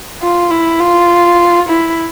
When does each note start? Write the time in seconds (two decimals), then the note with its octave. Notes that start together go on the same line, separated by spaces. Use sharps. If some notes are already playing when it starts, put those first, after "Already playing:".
0.22 F4
0.51 E4
0.80 F4
1.69 E4